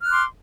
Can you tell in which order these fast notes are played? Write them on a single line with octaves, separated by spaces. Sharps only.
F6 F#6 D6 C6